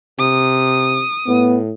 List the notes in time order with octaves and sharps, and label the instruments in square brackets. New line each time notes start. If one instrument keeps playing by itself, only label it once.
[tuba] C3 [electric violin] D#6
[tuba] A2 [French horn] B3